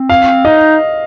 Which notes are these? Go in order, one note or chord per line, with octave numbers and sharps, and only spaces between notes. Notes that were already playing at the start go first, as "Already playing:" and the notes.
Already playing: C4
F5
D#4 D#5